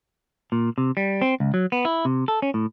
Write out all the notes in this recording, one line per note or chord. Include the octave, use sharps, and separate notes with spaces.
A#2
C3
G3
C4
C#2
F#3
B3
E4
C3
A4
C#4
A2